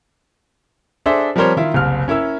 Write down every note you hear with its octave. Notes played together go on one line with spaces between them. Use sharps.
D4 G#4 A4 C5 E5
F3 G3 C4 A#4 C5 C#5
D#3 E4 F4
F#1 C2 F6
C#4 E4 A#4 E6